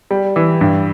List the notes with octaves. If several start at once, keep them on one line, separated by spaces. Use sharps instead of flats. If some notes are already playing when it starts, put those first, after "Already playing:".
G3
E3
G2